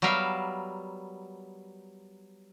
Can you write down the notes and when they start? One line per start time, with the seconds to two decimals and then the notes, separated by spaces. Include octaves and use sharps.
0.02 F#3 G3 B3 A#4 E5 F5